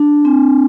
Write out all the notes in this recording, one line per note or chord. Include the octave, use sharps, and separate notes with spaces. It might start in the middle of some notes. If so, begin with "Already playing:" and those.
Already playing: D4
C4